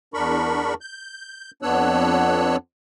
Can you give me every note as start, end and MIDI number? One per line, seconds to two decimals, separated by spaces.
0.14 0.74 40
0.14 0.74 62
0.14 0.74 70
0.14 0.74 83
0.14 0.74 85
0.81 1.51 91
1.62 2.56 41
1.62 2.56 59
1.62 2.56 62
1.62 2.56 73
1.62 2.56 88
1.62 2.56 90